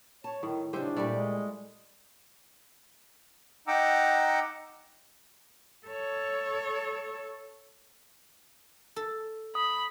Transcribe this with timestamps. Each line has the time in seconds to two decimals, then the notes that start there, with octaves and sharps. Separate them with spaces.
0.24 C#5 A5
0.43 A2 D#3
0.73 C#3 D4 D#4 G4 C5 E5
0.96 A#2 G3 A3 D5
1.11 G#3
3.67 D#4 F#5 G5 A#5 D6 E6
5.86 A4 C#5
8.96 A4
9.55 B5 D#6